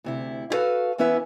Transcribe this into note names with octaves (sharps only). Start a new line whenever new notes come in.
D2 C3 E4
E4 F#4 A4 B4 F5
E3 B3 C#4 E4 B4 E5